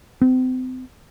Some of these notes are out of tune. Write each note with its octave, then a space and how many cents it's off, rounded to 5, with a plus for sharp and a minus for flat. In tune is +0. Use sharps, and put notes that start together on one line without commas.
C4 -35